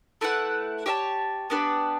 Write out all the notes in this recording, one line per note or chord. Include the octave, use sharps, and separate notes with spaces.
A3 E4 B4 F#5
G4 C#5 E5 A5
B3 D4 G4 B4